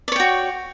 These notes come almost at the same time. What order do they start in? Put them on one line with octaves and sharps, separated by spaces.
D5 C#5 G5 F#4